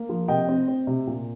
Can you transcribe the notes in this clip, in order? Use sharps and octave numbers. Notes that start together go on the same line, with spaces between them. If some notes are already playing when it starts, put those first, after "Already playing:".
Already playing: A#3
F3
C3 D#5 G5
C4
C4
C3
A#2